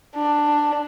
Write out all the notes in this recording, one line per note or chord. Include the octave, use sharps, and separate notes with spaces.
D4